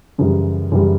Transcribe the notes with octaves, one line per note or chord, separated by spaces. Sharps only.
F#2 C#3 E3 G3
F#2 C#3 E3 G3